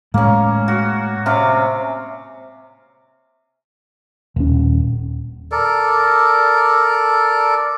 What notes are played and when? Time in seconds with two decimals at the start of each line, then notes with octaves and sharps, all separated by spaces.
0.14 A2 G#3 A#3 C#4
0.68 F#4
1.26 C3 C#4 F5
4.36 D#1 C#4
5.52 A4 A#4 D5